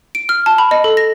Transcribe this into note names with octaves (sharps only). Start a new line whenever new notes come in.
D7
F6
A5
B5
D#5
A4
A#6